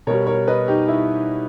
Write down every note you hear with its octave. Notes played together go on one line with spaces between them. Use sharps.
B2 G3 A#4 C#5
A#4 C#5
B4 D#5
D#4 G4
E4